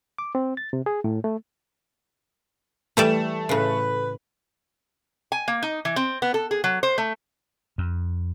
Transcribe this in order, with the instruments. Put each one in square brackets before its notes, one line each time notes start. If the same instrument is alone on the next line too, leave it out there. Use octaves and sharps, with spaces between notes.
[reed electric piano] D6
C4
A6
C3
G#4
A2
A3
[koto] E3 G3 D5 [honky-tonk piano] A3 E7
[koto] A2 C#3 [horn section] B4
[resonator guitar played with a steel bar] G#5
A#3
D#4
E3
C4
B3
A4
G#4
F#3
C5
A3
[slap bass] F2